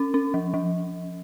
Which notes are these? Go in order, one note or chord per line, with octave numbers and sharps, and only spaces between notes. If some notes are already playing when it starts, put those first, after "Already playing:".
Already playing: C#4
C#4
F3
F3